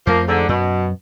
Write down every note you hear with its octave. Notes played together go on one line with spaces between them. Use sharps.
F2 F3 A3 A#3
G#2 D3
F#2 B2